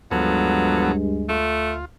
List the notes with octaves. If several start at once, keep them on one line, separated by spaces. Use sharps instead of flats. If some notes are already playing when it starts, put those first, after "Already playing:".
D2 G2 F3 F#3 G#3 B3 A4
A3 F4